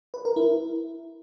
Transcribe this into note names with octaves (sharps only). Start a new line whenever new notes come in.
B4
A#4
E4